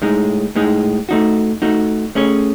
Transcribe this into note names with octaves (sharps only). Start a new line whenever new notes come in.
A2 G#3 D#4 G#4
A2 G#3 D#4 G#4
A3 D#4 F#4
A3 D#4 F#4
A3 C#4 G#4 C#5